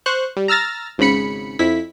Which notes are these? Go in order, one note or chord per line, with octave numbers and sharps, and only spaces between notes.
C5 C#6 F#6
G3
A#5 E6 F6 A6 A#6
G#1 G#2 C#3 B5 C#7
F2 E4 B6